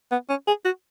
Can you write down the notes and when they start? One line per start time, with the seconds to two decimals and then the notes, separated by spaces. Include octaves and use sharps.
0.11 B3
0.29 C#4
0.47 G#4
0.65 F#4